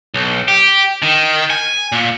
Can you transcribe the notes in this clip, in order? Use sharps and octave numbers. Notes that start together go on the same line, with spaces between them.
B1
G4
D#3
G#5
A#2